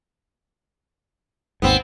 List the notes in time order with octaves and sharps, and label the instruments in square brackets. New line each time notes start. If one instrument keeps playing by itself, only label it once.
[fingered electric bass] G#1 D#2 G#2 [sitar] B3 C4